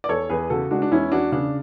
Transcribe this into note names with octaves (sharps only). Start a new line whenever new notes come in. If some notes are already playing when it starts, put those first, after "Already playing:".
D5
E2 A4 C#5
E2 G#4 B4
C#3 F#4 A4
G#3 D4 F#4
D4
E2 C#4 E4
E2 D4 F#4
C#3 D4